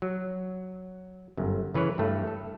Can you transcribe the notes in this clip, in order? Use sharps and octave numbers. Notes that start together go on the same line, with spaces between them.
F#3
G1 F#2
C#3 E3 B4 C#5
G2 A3
A4